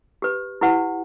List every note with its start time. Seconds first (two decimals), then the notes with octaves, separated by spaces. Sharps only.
0.22 G4 B4
0.61 E4 G4 B4 F#5